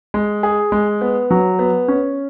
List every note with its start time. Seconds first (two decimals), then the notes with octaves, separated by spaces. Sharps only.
0.14 G#3
0.43 G#4
0.72 G#3
1.01 B3
1.31 F#3
1.59 B3
1.88 C#4